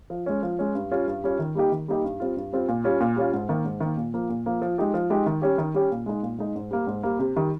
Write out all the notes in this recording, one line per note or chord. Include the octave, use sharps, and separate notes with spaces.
F3
G#3 C#4
F3
G#3 C#4
G2
G3 C#4 F4
G2
G3 C#4 F4
D#3
G3 A#3 D#4 G4
D#3
G3 A#3 D#4 G4
G2
G3 C4 F4
G2
G3 C4 F4
A#2
G3 C#4 F4
A#2
G3 C#4 F4
G#2
D#3 A#3
G#2
D#3 A#3
A#2
F3 A#3
A#2
F3 A#3
F3
G#3 D#4 G4
F3
G#3 D#4 G4
D#3
G3 C#4 G4
D#3
G3 C#4 G4
A#2
G#3 D#4
A#2
G#3 D#4
G#2
G3 A#3
G#2
G3 A#3
C3
D#3 G3